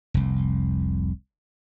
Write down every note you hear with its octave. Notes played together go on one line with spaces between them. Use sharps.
F1 C2